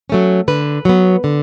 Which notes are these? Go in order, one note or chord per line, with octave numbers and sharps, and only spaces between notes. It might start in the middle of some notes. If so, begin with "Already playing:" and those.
F#3 A3 C#4
D3 B4
F#3 B3
D3